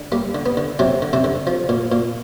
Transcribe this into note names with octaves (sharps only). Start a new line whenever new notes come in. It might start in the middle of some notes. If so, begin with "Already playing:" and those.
Already playing: D3
G3 A#3
D3
B3
D3
C3 F#3 C4
D3
C3 C4
D3
F3
A#2
A#2